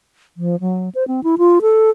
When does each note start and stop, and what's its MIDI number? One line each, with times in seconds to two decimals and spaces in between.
0.37 0.59 53
0.60 0.89 54
0.95 1.06 72
1.08 1.21 60
1.24 1.36 64
1.38 1.59 65
1.62 1.90 69